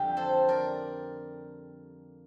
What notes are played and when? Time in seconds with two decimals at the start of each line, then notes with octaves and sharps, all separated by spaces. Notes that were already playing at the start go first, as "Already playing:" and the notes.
Already playing: F2 D3 G3 G4
0.17 A4 C5
0.48 A#4 D5